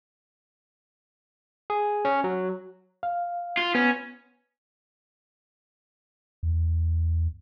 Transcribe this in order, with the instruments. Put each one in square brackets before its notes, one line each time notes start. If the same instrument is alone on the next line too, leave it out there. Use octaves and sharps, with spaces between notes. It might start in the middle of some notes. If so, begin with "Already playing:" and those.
[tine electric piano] G#4
C#4
F#3
[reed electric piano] F5
[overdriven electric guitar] F4
[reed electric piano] B3 [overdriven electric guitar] C#4
[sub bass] E2